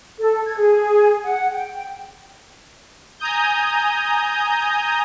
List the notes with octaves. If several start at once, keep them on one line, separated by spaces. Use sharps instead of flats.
A4
G#6
G#4
F#5
G5
G#5 A#5 D#6 G6